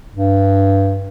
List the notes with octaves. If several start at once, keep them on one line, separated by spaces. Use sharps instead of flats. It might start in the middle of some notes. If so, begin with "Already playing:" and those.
G2